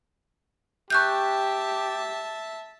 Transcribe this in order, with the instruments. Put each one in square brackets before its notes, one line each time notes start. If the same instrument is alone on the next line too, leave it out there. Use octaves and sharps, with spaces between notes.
[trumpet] G4 [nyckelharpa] E5 A5 [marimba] C#6 F#6 G6